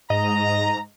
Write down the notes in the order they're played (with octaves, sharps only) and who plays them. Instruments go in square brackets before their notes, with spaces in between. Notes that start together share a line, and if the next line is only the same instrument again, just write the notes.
[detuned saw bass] G#2 [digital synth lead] D#5 [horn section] A#5